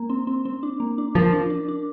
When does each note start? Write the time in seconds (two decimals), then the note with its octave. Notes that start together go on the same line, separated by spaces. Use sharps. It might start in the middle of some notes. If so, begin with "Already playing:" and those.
Already playing: A#3
0.10 C4
0.27 C4
0.45 C4
0.63 D4
0.80 A#3
0.98 D4
1.15 F3 A#4
1.32 D4
1.50 D4
1.68 D4